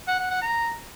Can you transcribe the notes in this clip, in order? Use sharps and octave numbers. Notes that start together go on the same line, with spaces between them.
F#5
F#5
F#5
A#5